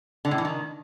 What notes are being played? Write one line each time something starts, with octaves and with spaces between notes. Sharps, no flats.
D3
A2
E3
D#3